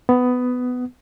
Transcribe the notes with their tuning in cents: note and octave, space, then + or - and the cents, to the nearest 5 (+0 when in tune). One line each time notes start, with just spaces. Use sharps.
B3 +15